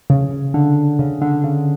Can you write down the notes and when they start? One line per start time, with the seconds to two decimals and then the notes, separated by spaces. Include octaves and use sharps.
0.10 C#3
0.54 D3
0.99 C#3
1.22 D3
1.44 C#3